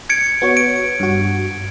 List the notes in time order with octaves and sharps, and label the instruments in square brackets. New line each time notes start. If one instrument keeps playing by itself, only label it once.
[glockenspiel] G#6 C#7 D7
[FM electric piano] B3 F#4 C#5
[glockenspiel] D7
[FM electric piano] G2 F#4